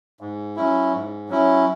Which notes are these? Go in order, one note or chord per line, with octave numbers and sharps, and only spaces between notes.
G#2
F#3 C#4 E4
G#2
F#3 C#4 E4